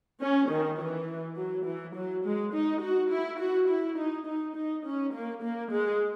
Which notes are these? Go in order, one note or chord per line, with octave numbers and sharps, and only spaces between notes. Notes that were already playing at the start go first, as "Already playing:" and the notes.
C#4
D#3
E3
F#3
E3
F#3
G#3
D#4
F#4
E4
F#4
E4
D#4
D#4
D#4
C#4
A#3
A#3
G#3